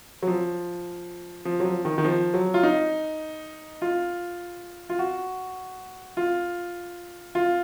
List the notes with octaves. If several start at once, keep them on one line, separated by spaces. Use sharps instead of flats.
F#3
F3
F3
F#3
F3
D#3
D#3
F3
F#3
F4
D#4
F4
F4
F#4
F4
F4